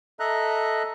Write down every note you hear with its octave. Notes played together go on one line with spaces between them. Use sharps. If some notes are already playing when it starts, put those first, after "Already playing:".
A4 D#5 E5 A#5 F#6